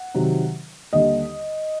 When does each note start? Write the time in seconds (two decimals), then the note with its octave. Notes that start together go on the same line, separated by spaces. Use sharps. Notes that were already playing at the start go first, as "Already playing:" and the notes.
Already playing: F#5
0.15 C3 D#3 F#3
0.93 D#2 D3 G3 D#5